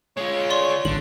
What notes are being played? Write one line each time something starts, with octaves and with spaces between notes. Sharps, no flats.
G#3 F4 C#5
D5 C6 C#6
A1 D3 F#7